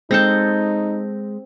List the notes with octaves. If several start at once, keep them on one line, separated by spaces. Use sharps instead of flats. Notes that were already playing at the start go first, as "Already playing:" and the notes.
G#3 C4 D#4 A4 A5 G6 A#6